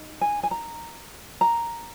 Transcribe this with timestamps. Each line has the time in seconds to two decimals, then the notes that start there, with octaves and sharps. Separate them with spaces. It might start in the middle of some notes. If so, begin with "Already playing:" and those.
Already playing: D#4
0.21 G#5
0.43 G#5
0.51 A#5
1.41 A#5